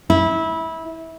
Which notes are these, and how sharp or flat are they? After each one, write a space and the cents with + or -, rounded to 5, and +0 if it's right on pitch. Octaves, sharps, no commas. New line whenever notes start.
E4 -20